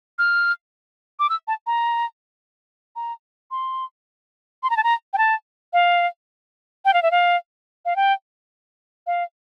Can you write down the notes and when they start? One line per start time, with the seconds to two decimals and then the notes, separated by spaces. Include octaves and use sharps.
0.19 F6
1.19 D6
1.30 E6
1.48 A5
1.67 A#5
2.96 A#5
3.51 C6
4.63 C6
4.70 A#5
4.77 A5
4.84 A#5
5.13 G5
5.18 A5
5.73 F5
6.85 G5
6.94 F5
7.02 E5
7.11 F5
7.85 F5
7.96 G5
9.07 F5